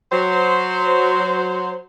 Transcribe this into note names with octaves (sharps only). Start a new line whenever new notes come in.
F#3 C5